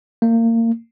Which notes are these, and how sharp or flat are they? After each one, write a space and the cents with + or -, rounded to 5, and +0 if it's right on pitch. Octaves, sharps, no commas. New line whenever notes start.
A#3 -30